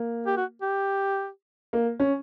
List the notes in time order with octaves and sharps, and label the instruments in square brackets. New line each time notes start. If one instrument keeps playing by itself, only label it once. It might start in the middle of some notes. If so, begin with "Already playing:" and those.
Already playing: [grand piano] A#3
[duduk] G4
F#4
G4
[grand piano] A#3
C#4